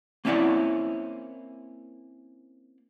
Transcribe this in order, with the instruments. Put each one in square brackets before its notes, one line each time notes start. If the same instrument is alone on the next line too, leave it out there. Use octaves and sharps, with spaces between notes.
[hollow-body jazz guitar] A#3 C4 C#4 E4 D5 F#5